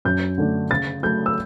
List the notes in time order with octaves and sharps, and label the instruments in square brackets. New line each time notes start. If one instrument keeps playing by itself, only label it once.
[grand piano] F#2 G6
D3 A3 D4
C#3 A6
F#3 A3 G6
E6